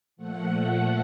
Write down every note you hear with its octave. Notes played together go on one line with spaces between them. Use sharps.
A#2 F3 A3 F#5